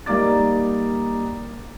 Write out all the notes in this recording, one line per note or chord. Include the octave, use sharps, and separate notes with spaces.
G3 A#3 D#4 D5 D6 A6